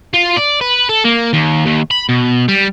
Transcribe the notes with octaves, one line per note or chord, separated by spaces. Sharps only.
F4
D5
B4
A4
A#3
D#2
D#2
B5
B2
G3